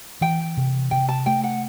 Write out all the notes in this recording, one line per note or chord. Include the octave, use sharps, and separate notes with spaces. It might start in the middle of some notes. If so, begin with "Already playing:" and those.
E3 G5
C3
C3 G5
A5
A3 G5
F#5